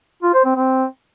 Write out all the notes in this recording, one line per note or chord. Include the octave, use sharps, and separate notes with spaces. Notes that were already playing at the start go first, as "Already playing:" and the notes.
F4
C5
C4
C4